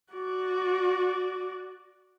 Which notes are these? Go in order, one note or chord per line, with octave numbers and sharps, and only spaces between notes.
F#4 D5